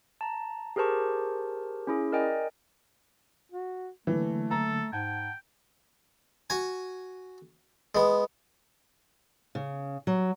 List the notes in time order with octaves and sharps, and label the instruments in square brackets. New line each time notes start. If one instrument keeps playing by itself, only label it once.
[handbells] A5 A#5
G4 G#4 A#4 C5 A5 C#6
C#4 E4 G#4
A#4 D5 D#5 G5 G#5
[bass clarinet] F#4
[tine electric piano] D3 F#3 A#3 [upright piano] E3 [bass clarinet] A3
[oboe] A4 [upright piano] A#5
[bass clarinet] G#2 [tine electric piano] F#5 A5 G#6 [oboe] G5
[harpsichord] F#4 G#5
G#3 B3
[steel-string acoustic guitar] C#3
F#3